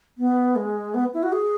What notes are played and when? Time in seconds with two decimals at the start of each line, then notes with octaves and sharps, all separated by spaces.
0.18 B3
0.56 G#3
0.94 B3
1.14 E4
1.23 F#4
1.32 G#4